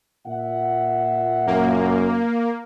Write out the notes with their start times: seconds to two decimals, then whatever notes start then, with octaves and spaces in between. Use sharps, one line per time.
0.27 A#2 E5 F#5
1.47 F#2 A#3